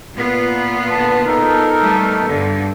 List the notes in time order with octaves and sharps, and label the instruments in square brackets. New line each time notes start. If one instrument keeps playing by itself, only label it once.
[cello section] A#2 B3 F4
[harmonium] D3 A5
D#4 A4 A#4
[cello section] G3 A3 B3
G2 D3